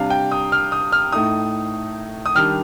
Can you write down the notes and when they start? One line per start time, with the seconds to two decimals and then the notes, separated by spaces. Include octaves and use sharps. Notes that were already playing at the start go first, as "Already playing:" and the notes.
Already playing: C3 G3 D4 F5
0.10 G5
0.31 D#6
0.52 F6
0.72 D#6
0.92 F6
1.12 A2 A3 D#4 D#6
2.26 D#6
2.35 D#3 G3 D4 F6